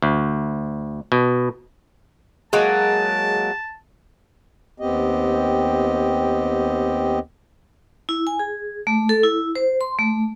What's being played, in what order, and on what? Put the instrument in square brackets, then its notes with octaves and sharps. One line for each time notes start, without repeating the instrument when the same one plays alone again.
[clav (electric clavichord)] D2
B2
[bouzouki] F#3 G#3 A#3 [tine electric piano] G#4 [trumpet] A5
[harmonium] D#2 B3 C4 G4 D#5
[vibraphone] E4
G#5
G#4
A3
A4
E4
C5
C6
A3